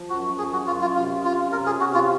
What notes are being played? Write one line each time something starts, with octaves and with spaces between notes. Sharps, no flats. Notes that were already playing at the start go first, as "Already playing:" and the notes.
Already playing: F3
F#2 F#4
F#2 G#4
F#4
F#2 F4
F4
C3 F4
C#4 F4
C3 A#4
G#4
C3 F#4
F4